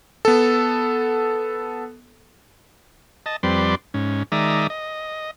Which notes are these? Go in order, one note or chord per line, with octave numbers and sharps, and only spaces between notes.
B3 A4
D#5 A5
F2 G3 C4 B4 D5 C6
G#2 C#4
D#3 G#3 D5 E5 A#5 D#6
D#5